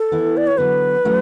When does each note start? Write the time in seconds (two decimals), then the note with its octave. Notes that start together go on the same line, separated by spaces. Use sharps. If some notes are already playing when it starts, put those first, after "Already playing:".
Already playing: A4
0.12 E3 B3 E4
0.37 D5
0.47 C#5
0.58 D3 F#3 B3 B4
1.05 F#3 A3 C#4 E4